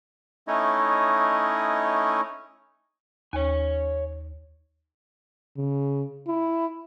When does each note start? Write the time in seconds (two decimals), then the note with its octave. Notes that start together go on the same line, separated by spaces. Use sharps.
0.48 A3 C#4 D#4 E4 C#5 D#5
3.33 D#2 C#5 G#5
5.57 C#3
6.27 E4